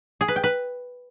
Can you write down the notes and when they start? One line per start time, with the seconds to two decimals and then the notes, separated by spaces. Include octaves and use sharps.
0.21 G#4
0.28 B4
0.36 G5
0.44 B4